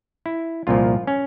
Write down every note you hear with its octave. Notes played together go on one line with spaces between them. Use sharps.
E4
C2 A#2 F3 F4
C#4